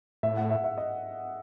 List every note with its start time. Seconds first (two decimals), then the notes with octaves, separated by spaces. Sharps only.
0.23 A2 E5
0.37 F#5
0.51 E5
0.64 E5
0.78 D#5